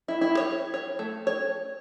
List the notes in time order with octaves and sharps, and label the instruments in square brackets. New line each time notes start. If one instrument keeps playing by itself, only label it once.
[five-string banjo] E4
E4
C#5
C#5
A3
C#5